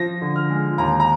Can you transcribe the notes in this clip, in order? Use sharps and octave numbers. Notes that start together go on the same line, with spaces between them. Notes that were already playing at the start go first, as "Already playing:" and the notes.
Already playing: F3 A#6
D3
F6
G#3
D#2 A#5
A#5